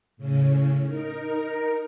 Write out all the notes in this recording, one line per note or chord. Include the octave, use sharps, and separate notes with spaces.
A2 C#3 C#4
D#4 A#4